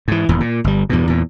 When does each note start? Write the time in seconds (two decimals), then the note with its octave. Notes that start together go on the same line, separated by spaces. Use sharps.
0.08 G#2 E3
0.29 D#1 E2 A2
0.40 A#2
0.64 G1 G3
0.89 E2 G2 B2
1.08 E2 A#2